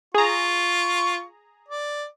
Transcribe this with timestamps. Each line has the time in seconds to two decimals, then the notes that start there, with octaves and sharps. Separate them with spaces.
0.14 F4 G#4 A#5 C#6
1.68 D5